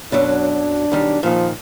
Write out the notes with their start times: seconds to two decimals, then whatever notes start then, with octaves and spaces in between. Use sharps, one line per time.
0.12 F#2 B2 F#3 D4
0.92 B1 D#3 G3
1.23 A#2 D#3 F3